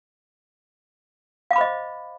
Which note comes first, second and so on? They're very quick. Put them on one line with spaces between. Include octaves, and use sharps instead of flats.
F5 D6 B5 C5 D#5